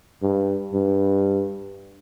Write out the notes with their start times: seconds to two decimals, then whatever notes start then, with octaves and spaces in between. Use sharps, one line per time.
0.22 G2
0.73 G2